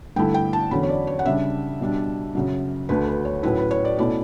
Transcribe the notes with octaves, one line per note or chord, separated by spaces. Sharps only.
G2 D3 A3 E4 G5
G5
A5
E2 D3 F#3 C#4 B5
C#5
D5
C#5
F#5
C#3 G3 D4 E5
B2 G3 D4
F#2 C#3 F#3
D2 D3 A3 B4
B4
C#5
A2 F#3 C#4 E4 B4
B4
C#5
D5
B2 A3 C#4 E4 D5